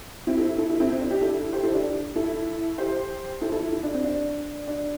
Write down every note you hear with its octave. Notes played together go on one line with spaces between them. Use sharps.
C4 E4
E4 A4
E4 A4
E4 A4
C4 E4
C4
D4
D4 G4
E4 A4
G4 C5
E4 A4
D4 G4
E4 A4
G4 C5
E4 A4
E4 A4
E4
D4
C4
D4
D4